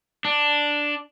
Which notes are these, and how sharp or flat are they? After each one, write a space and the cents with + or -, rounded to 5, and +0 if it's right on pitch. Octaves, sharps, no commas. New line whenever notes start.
D4 +0